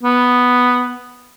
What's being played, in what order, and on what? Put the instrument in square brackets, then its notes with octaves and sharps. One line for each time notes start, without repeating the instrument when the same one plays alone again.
[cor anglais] B3